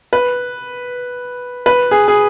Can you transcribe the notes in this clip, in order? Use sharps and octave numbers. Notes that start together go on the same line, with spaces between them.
B4
B4
G#4
G#4